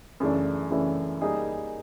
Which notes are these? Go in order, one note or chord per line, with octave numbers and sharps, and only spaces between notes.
F#2 C#3 E3 A3 D4
F#2 C#3 E3 A3 D4
G3 A#3 D#4 G#4